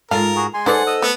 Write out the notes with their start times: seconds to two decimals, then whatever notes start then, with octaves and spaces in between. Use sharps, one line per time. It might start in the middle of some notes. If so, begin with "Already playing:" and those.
0.11 G#2 F4 A4 A#4 F5
0.36 F#4 G#4
0.54 G#3 G#5 C6
0.66 D#4 A4 B4 C5 D5 F#5
0.87 D#5 D#6 E6
1.02 A3 B3